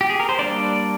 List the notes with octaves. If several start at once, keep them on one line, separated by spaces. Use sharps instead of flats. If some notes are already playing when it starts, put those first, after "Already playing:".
G4
G#4
A#4
C5
G3 A#3 D4 D5